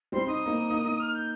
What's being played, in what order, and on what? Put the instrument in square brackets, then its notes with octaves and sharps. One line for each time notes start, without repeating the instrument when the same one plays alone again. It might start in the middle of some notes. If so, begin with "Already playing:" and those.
[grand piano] G3 C4 [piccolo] C6
[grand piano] D#4 [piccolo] D#6
[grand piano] A#3 D#4
A#3 D#4
A#3 D#4
[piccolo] F6
G6